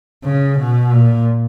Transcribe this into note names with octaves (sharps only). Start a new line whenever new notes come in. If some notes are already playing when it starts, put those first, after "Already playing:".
C#3
B2
A#2